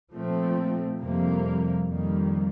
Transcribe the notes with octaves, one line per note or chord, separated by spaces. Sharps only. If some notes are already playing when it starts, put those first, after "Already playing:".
A#2 F3 A3 C4
F2 C3 G3 A#3
F2 D#3 G3 A#3